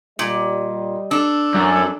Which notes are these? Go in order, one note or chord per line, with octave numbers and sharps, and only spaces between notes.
A#2 G3 D#5
D4 A4
F#2 A2